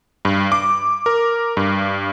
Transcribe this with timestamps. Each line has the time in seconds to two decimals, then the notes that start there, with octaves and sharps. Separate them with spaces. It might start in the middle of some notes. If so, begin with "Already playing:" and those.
0.25 G2
0.52 D6
1.06 A#4
1.57 G2